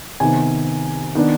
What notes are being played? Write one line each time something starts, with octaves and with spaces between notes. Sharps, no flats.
C3 D#3 B3 G#5
D#3 B3 D4